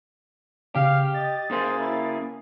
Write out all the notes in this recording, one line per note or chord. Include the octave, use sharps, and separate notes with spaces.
C#3 G4 F5
D#5 A6
C#3 A#3 G#4 C5
E4